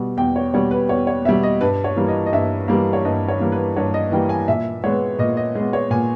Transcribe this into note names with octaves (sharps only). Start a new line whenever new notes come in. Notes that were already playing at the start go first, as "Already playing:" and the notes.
Already playing: B2 G3
E2 G5
C#5
B2 G3 C#5
B4
E2 C#5
C#5
B2 G3 E5
D#5
G2 B4
C#5
E3 G3 A#3
D#5
D#5
G2 E5
E3 G3 A#3
C#5
G2 D#5
C#5
E3 G3 A#3
B4
G2 C#5
D#5
E3 G3 A#3 G5
G#5
A#2 E5
G#3 B3 C#5
A#2 D#5
D#5
G#3 B3
C#5
A#2 G#5